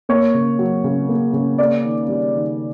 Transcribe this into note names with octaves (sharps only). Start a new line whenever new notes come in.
A#3 C#5
C#3
F#3
C#3
A#3
C#3
A#3 D5
D#3
G3
D#3